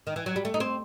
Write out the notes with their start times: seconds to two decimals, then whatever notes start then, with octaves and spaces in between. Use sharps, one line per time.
0.07 D#3
0.16 E3
0.26 F#3
0.36 G3
0.45 A3
0.54 D#4
0.60 C4